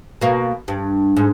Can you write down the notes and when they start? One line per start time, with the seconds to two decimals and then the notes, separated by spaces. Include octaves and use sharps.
0.21 B2 A#3
0.68 G2
1.16 G#2